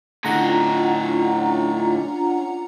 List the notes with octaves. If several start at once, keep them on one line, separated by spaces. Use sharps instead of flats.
A2 D3 C#4 D4 F4 F#5 A#5